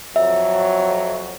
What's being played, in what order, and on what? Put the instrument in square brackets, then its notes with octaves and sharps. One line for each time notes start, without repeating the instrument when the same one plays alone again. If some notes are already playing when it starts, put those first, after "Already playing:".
[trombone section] F2 F#3 [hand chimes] E5